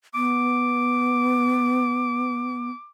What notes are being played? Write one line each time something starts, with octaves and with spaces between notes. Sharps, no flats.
B3 D6